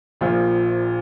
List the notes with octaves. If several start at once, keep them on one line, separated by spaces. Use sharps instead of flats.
A#1 A#2 F3 F4